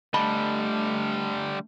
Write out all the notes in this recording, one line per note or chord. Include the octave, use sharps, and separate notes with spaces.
D3 G3 A3 D#5 A5 B5